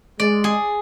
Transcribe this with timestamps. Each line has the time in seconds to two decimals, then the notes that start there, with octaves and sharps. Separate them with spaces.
0.20 G#3 D5
0.44 G#4